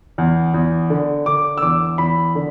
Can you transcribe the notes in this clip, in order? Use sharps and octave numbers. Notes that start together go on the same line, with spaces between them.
E2
E2
D3
D3 D6
E6
E2 D6
E2 B5
D3